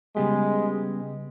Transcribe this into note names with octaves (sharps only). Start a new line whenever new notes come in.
C#3 G3 G#3 B3 G4